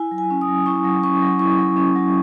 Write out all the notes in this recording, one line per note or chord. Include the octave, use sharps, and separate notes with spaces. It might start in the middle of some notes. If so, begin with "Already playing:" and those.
Already playing: E4 G#5
F#3
G#5
C#4
D#6
F#3
E4 C#6
F#3
C#4 C#6
F#3
E4 C#6
F#3
C#4
F#3